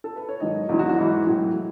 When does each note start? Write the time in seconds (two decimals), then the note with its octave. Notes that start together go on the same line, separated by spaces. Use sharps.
0.04 A4
0.16 B4
0.29 C#5
0.40 G#2 D#3 F#3 D#5
0.69 E2 D#3 F#3 E4
0.79 F#4
0.89 F#4
0.98 G#2 E3 E4
1.27 A2 F#3